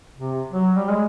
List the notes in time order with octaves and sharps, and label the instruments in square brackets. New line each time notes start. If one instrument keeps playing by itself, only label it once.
[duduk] C3
F#3
G3
G#3